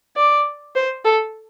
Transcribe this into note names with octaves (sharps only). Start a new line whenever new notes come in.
D5
C5
A4